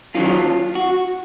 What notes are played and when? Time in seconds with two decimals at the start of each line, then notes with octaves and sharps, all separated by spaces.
0.15 F#2 D#3 F#3 F4
0.75 F#4